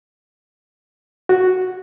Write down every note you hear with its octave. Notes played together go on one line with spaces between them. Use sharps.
F#4